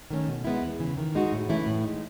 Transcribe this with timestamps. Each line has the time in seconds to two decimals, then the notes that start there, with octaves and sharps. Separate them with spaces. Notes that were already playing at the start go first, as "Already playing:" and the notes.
0.11 D#3 A3 C#4
0.28 B2
0.45 G#3 B3 E4
0.62 E2
0.79 C#3 E3
0.97 D#3
1.15 G#3 D#4 F#4
1.32 A2
1.49 E3 A3 C#4 E4
1.66 A2
1.84 G#3 D#4